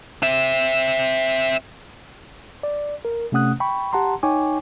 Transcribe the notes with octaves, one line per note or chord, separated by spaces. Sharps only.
C4 E5
D5
A#4
C3 A3 C#4 F#5 D#6 F#6
G5 B5 C#6
G4 F#5 A5 A#5 C6
D#4 C#5 G5 G#5 C#6 D6